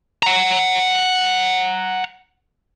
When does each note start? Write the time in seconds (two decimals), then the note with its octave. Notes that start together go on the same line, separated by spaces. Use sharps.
0.23 F#5 A#5